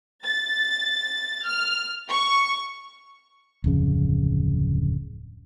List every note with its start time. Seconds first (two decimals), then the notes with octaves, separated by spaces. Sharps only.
0.23 A6
1.47 F6
2.10 C#6
3.64 D1 F2 C#3